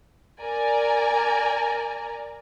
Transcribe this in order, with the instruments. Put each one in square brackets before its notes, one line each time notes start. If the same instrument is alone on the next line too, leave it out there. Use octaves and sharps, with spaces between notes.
[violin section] A#4 D5 G#5 A#5